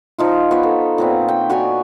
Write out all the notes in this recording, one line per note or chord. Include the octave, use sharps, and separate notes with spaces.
F3 D#4 F4
B3 F4 C#5
A4
A#2 B3 C4
G5
F#4 C#5 D5 G#5